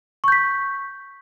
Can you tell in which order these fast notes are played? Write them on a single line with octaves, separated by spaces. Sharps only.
C#6 G6 B6